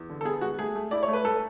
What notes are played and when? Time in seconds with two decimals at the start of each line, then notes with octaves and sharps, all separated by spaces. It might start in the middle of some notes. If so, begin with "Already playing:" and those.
Already playing: E2
0.09 D3
0.21 A4
0.25 B3 G#4
0.41 G#3 F#4
0.59 A3 G#4
0.75 A3
0.91 E4 D5
1.03 C#5
1.08 A3
1.13 B4
1.25 A3 A4